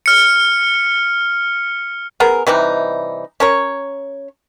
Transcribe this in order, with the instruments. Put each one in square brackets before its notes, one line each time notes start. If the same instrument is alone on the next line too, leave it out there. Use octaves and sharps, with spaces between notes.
[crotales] F6 C#7
[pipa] B3 G#4 A#4
C3 E3 G3 D#4
C#4 A#4 C#5